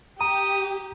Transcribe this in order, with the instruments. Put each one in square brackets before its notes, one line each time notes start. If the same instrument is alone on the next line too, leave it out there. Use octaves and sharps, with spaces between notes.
[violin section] G4 [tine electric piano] A#5 [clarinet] D#6